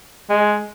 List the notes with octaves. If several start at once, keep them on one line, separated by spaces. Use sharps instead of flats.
G#3